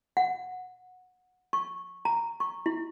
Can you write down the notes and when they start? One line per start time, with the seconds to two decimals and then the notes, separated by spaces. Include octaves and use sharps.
0.17 F#5
1.53 C#6
2.05 A#5
2.40 C#6
2.66 E4